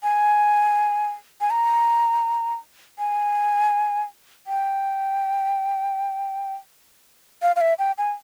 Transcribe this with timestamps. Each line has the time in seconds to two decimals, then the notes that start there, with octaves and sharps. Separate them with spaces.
0.03 G#5
1.41 G#5
1.50 A#5
2.99 G#5
4.47 G5
7.42 F5
7.56 F5
7.61 E5
7.79 G5
7.98 G#5